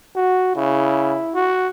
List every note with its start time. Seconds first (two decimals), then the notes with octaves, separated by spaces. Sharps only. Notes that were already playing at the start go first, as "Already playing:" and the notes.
0.16 F#4
0.56 C#3 E4
1.35 F#4